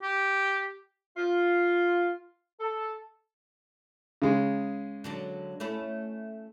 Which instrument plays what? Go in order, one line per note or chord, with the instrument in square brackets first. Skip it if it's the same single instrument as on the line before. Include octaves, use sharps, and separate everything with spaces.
[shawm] G4
[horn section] F4
A4
[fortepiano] C#3 G#3
[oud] D3 F#3 D4
A3 C#4 E4